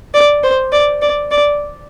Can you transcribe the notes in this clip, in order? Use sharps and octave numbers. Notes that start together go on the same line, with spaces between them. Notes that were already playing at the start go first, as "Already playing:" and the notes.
D5
C5
D5
D5
D5